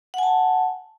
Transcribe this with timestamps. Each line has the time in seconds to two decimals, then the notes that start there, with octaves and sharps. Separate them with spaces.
0.14 F#5
0.18 G#5
0.23 A5